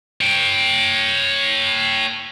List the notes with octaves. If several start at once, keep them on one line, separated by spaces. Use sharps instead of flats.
C#5 G5